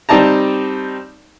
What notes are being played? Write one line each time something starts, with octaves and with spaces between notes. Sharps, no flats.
G3 C4 D#4 D5 A5 A#5